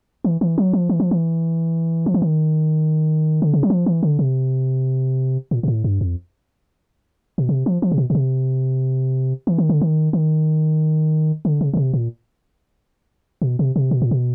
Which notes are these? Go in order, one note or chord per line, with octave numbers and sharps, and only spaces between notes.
E3
E3
F#3
F3
E3
F3
E3
F3
E3
D#3
D3
C#3
F#3
F3
E3
D3
C3
A#2
A#2
A2
G2
F2
B2
C3
F3
F3
C3
B2
B2
C3
E3
D#3
D3
D#3
D#3
D3
C#3
C#3
C3
A#2
B2
C3
C3
B2
A#2
B2